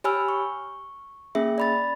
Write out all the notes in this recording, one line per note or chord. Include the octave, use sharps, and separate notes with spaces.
G4 C#5 G#5 B5 E6 F6
C#6
A#3 C#4 G#4 E5
D5 B5 A6